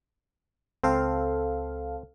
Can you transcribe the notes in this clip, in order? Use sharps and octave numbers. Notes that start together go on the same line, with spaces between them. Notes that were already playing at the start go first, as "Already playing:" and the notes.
C#2 C4 A4 F5